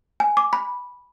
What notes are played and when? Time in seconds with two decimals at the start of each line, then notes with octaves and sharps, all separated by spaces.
0.20 G#5
0.37 D6
0.53 B5